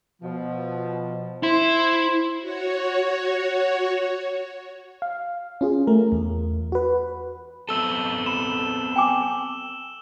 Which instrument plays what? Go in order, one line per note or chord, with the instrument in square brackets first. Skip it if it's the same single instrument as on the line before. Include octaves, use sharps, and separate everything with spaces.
[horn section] B2 F3
[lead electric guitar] E4 [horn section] C5 C6
[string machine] F#4 C#5
[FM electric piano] F5
C#4 F4 G#4
A3 A#4
E2
F#4 B4
[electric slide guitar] B3 C4 A4 [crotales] E6 G7
[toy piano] B5 [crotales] E7
[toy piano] G5 G#5 D6